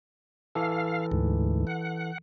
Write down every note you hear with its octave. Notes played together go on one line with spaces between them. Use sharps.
E3 A4 F5
D2 G#2
F#5